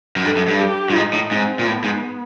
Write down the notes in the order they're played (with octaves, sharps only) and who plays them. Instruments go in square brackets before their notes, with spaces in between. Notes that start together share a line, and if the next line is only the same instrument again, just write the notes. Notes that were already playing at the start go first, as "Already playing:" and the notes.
[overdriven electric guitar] F#2
[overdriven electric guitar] G2 [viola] A4
[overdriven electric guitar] F#2
G2
[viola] G4
[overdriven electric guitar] G2
[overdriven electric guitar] G#2 [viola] D#4
[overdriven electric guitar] A2
[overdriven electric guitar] G#2 [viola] C4
[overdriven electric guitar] A#2
[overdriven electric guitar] A2 [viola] B3
[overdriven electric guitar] G#2